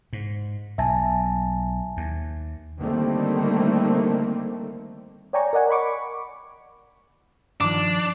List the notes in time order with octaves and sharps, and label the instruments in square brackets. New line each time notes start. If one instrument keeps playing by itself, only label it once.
[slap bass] G#2
[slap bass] B1 [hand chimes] E5 G#5 A5
[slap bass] D#2
[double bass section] D3 D#3 G3 A3 A#3 C4
[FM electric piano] C#5 D5 G5 G#5 A#5 C#6
A#4 D5 D#5 F#5 G#5
F#5 B5 C#6 D6
[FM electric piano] G2 D#3 F3 [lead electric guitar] D4 [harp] D6